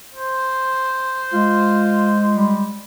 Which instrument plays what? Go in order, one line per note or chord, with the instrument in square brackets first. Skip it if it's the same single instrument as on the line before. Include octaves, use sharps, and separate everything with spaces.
[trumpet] C5
[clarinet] G#3 [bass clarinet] F4
[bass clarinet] G3